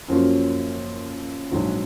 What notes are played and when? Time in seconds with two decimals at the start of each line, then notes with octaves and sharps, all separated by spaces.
0.08 F#2 F3 A#3 C#4 F#4
1.51 A#1 G#2 F#3